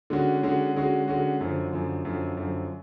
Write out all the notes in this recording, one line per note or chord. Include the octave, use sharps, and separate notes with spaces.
D3 G#3 C#4 F#4
D3 G#3 C#4 F#4
D3 G#3 C#4 F#4
D3 G#3 C#4 F#4
F#2 D3 F3
F#2 D3 F3
F#2 D3 F3
F#2 D3 F3